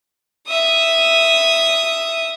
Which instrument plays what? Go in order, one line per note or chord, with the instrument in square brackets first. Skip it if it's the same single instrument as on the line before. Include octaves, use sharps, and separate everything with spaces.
[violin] E5 D#6